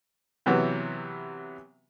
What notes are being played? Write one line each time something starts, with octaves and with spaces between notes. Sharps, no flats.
C3 E3 F#3 B3